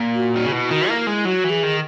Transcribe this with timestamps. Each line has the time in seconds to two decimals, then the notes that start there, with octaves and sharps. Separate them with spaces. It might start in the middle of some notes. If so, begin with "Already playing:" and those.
Already playing: A#2
0.15 F#4
0.36 D#3
0.45 C#3
0.52 B2 E4
0.71 D#3 F#4
0.89 A#3 E4
1.07 G#3 E4
1.25 F#3 F#4
1.44 E3
1.50 G#4
1.63 D#3